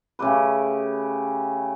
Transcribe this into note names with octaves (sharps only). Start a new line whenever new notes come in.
C#3 A3 G4 B4